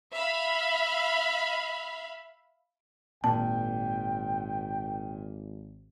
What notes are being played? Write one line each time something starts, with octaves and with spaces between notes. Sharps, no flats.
E5 F5 B5
G#1 A#2 G5 A5